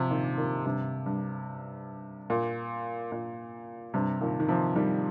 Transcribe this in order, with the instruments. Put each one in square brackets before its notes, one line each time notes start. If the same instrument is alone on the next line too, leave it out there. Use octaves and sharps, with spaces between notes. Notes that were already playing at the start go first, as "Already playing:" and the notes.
Already playing: [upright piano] C3 F3
A#2 D#3
A#2 D#3
G2 C3
G2
A#2
A#2
G2 C3
A#2 D#3
D#3
C3 F3
D#3 G3